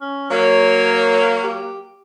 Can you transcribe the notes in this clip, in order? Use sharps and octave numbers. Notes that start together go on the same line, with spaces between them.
C#4
F#3 A#3 C#5
G4